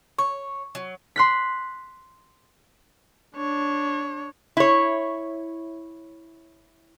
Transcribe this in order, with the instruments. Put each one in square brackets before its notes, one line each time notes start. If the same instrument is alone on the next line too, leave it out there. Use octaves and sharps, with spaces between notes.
[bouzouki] C#5 [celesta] C#6
[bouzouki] F#3
[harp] C6 F#6 B6
[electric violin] D4 C#5
[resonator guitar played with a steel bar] E4 C#5